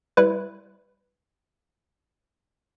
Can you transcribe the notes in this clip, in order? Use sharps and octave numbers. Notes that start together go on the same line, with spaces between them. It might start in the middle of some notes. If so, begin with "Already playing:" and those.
G3 E4 B4